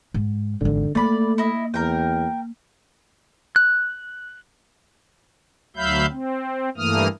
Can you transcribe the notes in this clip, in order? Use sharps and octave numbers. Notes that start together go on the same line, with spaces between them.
G#2
G#1 E2 D3
A3 A#3 D5 B5
E4 D#5
E2 A#4 G5
F#6
D2 F#3 E5 F5 B5 G6
C4
G2 E3 A3 A#3 D#6 F6